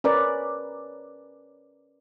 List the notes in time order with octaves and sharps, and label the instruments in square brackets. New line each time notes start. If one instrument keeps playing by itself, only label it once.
[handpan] C#4 A#4 B4 D5